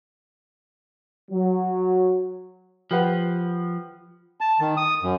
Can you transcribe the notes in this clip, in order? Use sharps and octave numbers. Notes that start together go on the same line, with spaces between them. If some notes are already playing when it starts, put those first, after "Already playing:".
F#3
F3 G4 B4 F#5
A5
D#3
D#6
F#2